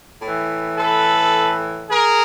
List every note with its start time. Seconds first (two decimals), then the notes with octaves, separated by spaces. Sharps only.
0.22 A2 E3
0.78 A4 B4
1.89 G#4 A#4